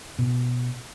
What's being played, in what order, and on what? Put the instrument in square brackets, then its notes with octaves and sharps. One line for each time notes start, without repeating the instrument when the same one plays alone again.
[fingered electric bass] B2